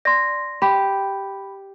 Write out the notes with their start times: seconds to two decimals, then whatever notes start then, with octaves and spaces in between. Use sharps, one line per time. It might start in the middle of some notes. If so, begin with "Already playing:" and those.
0.05 D5 C6 A#6
0.62 G4 B5